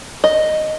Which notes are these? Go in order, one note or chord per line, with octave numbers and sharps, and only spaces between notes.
D#5